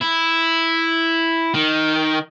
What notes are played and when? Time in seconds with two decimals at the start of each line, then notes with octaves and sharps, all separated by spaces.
0.02 E4
1.54 D#3